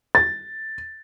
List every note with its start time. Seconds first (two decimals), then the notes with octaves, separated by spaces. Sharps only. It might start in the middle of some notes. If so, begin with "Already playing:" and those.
0.15 A6